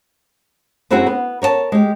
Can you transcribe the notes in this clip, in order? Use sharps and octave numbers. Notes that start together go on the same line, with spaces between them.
F#2 C4 E4 F#4 G#4 F#5
B3
A#4 C#5 D5 A5
G#3 G4